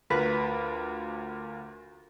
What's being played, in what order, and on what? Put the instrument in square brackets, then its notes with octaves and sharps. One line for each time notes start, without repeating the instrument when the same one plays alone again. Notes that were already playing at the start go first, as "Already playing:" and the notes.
[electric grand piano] D2 F4 A#4 [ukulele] B4